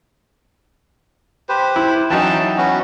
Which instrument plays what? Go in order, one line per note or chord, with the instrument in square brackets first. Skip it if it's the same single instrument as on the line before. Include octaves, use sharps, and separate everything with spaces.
[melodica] G4 B4 C5
[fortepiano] E4
[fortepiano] E3 F#3 D#4 [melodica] C#4 G5 A5
[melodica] B3 C#4 F#4